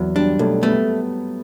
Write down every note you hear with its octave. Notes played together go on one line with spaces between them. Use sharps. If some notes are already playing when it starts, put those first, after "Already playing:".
Already playing: E2 F#3
G3 D4
B1 A3
A3 B3